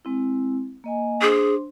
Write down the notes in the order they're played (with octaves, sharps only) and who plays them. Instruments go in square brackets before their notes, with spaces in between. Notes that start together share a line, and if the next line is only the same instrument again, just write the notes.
[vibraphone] G#3 C4 E4
A#3 D#5 G#5
[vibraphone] D4 C5 C6 [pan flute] G#4